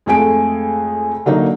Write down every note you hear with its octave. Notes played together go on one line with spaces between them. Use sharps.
F2 G#3 A3 G#4 G#5 D7
D3 F#3 A#3 D4 D#4